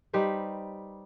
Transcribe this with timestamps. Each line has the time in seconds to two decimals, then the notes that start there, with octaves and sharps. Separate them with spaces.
0.13 G3 D#4 B4 C5